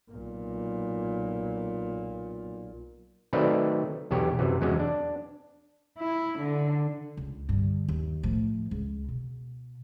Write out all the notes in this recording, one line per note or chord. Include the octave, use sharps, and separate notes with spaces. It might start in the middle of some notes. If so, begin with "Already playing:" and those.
B1 A#2
D#3 F#3 A3 C4 B4 D5
B1 E2 G4 C#5
F#2 C3 E3
E2 F#3 G#3 C#4
D4
E4
D3
C#2
G2 D3
D#2
A2 F3
C#2
B2